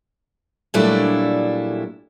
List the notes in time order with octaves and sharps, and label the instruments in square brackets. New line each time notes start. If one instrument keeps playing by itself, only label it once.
[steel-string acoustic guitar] A#2 F#3 G3 A3 D4 E4